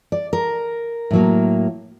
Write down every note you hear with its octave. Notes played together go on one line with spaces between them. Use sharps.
D5
A#4
A2 F#3 A#3